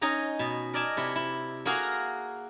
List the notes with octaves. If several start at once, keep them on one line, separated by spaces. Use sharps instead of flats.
C#4 D#4 D#5 G#5 A#5
B2
A#4 D5 D#5 G#5 A5
C3 E4
E4
A#3 F#4 G#4 A#4 F5